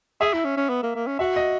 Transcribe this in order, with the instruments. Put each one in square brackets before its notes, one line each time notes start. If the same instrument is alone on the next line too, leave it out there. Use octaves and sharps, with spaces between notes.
[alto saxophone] G#4 [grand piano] E5
[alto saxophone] E4
C#4
C#4
B3
A#3
A#3
C#4
[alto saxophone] F#4 [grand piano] E5
[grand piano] D#5